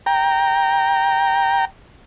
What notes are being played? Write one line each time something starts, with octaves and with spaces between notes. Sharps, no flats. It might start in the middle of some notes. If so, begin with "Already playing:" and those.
G5 A#5